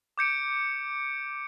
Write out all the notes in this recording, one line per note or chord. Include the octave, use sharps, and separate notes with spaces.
D6 G6 C#7 D7